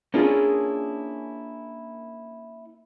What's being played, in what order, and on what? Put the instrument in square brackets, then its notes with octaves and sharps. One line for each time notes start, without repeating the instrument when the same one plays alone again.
[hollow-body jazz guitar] A#3 C#4 D4 E4 F4 G#4